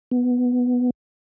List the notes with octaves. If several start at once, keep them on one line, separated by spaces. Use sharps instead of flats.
B3